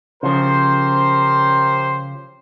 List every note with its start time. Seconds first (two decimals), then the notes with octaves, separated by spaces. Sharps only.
0.23 C#3 F3 G4 A#4 C5